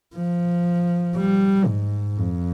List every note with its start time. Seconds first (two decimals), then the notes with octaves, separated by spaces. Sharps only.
0.16 F3
1.17 G3
1.67 G#2
2.18 F2